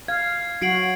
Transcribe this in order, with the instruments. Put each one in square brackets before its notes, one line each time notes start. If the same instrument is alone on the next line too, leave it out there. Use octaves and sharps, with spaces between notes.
[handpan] F5 [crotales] G#6
[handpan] F#3 F#4 [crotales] C7 D7 F#7